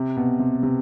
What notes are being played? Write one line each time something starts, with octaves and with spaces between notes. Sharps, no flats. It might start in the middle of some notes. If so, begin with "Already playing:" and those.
Already playing: C3
B2
C3
C3